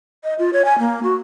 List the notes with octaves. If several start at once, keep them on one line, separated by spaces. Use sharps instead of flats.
D#5
F4
C#5
G#5
A#3
F#4